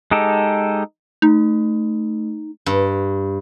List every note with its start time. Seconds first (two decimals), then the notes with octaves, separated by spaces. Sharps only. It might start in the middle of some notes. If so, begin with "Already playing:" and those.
0.11 G#3 D#4 G4 A4
1.22 A3 D#4
2.66 G2